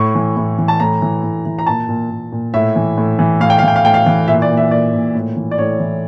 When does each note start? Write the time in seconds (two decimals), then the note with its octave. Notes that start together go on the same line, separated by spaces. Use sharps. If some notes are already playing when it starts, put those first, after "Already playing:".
Already playing: A2 C#6
0.15 E3
0.37 A2
0.59 E3
0.68 A5
0.80 A2 A#5
1.02 E3
1.23 A2
1.46 E3
1.59 A#5
1.67 A#2 A5
1.89 A#2
2.11 A#2
2.32 A#2
2.54 A2 E5
2.76 E3
2.98 A2
3.19 E3
3.40 A2 F5
3.50 G5
3.58 F5
3.63 E3 G5
3.76 F5
3.84 A2 G5
3.94 F5
4.06 E3
4.28 A#2 E5
4.42 D5
4.49 A#2
4.57 E5
4.71 A#2 D5
4.93 A#2
5.15 A2
5.36 E3
5.51 D5
5.58 A2 C#5
5.80 E3